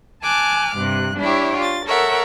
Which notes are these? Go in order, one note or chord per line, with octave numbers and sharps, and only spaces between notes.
G#5 A5 D6 F6 F#6
G2 C3 F#6
D4 E4 G4 C#5
F4 A6
A4 A#4 C#5 E5 F#5